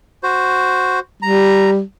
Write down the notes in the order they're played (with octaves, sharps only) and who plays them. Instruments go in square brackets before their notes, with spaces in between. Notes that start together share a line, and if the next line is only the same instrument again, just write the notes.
[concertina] F#4 C5
[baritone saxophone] G3 [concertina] A#5